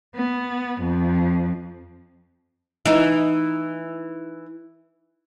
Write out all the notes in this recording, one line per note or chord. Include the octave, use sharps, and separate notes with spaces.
B3
F2
E3 D#4